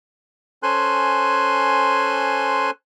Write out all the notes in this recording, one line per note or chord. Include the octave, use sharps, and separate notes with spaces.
C#4 A4 C5 G#5 C6 F#6